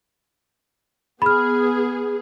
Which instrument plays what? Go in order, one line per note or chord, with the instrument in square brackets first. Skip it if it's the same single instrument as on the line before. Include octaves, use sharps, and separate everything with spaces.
[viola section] B3 G#4 [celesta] B5 F6